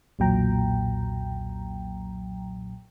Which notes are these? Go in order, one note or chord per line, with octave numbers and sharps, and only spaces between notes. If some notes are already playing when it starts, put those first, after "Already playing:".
B1 E2 A#2 F#3 G5 A#5